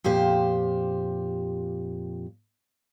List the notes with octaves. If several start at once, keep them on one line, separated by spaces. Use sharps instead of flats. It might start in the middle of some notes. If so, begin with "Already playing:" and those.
F2 A#2 G4 C5